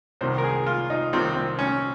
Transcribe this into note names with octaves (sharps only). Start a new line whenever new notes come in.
C2 C3 D#3 C5
A#4
G#4
F4
D#4
C2 C3 D#3 C4
C4
C#4